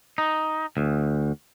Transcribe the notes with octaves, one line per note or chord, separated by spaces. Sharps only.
D#4
D2